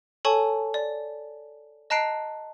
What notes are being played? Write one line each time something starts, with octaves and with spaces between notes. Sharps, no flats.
A4 C#5 G#5 A5 C#6
D5
D#5 A5 A#5 F#6 C7 D7